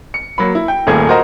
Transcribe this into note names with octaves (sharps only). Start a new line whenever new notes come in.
C#7
F#3 A#3 B5
E4
G5
D#1 G#1 A#2 A3 G#4 G#6
F4 F#4 A#4 C5 D#5 A#5